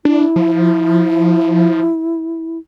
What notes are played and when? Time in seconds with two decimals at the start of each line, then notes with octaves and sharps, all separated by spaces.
0.05 D4 E4
0.36 F3